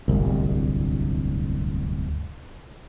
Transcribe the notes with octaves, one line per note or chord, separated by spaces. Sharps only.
D1 G1 C2